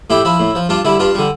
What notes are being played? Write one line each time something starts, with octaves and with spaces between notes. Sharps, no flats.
A2 E4 G4
F3 E4
A2
F3
G2 D4 F4
D3 G3 E4
G2 D4 F4
D3 G3